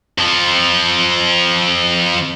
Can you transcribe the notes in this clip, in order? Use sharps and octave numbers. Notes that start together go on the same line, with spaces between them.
F2 F3